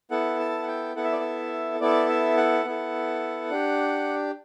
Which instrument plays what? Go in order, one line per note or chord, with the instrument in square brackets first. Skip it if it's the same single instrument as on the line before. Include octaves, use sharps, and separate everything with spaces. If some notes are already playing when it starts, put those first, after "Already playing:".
[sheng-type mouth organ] B3 E4 A4 F#5
A5
F#5
G5
B3 E4 A4 F#5
E5
D5
E5
B3 E4 A4 D5
E5
F#5
B3 E4 A4
D4 G4